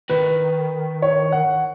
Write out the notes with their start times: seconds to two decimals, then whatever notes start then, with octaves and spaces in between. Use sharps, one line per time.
0.10 D#3 B4
1.02 C#5
1.32 F#5